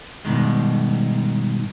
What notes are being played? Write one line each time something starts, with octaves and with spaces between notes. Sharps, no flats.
G2 B2 D#3 G#3